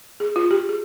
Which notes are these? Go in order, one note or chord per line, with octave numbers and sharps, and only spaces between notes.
G#4
F4
G4
G#4